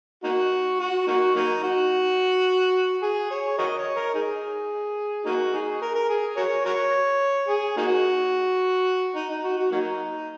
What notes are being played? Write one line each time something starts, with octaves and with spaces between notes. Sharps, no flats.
A#3 D#4 F#4
F#4
A#3 D#4 F#4
F#3 A#3 D#4
F#4
G#4
C#5
F#4 A#4 D#5
C#5
A#4
D#4 G#4
A#3 D#4 F#4
D#4 G#4
A#4
A#4
G#4
F#4 A#4 C#5
F#4 A#4 C#5
G#4
A#3 D#4 F#4
D#4
D#4
F#4
F#4
F#3 A#3 D#4